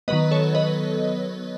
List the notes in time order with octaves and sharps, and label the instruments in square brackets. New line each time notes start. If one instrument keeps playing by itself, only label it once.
[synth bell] D#3 F#3 B3 B4 D#5
A4 C#5
B4 D#5